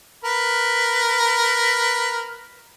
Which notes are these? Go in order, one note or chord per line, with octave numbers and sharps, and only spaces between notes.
A#4 B4